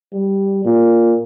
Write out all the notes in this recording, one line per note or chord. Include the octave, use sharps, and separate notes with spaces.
G3
A#2